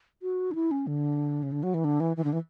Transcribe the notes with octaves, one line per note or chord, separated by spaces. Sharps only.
F#4
D4
E4
C#4
D3
C#3
D3
F#3
E3
D3
E3
E3
D3
E3